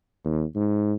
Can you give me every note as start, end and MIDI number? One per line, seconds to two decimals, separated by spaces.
0.25 0.44 39
0.56 0.93 44